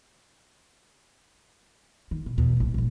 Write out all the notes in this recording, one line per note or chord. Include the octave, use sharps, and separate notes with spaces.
D#3
B2
E2 B2
F1 B1
F1 A#1